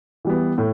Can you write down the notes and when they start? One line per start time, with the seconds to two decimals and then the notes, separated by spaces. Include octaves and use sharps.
0.25 E3 G3 B3
0.58 A2